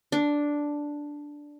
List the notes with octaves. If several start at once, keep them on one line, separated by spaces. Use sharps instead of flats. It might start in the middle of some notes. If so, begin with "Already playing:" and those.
D4